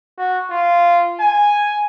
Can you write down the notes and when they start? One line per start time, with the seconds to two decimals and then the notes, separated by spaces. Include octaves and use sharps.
0.18 F#4
0.51 F4
1.20 G#5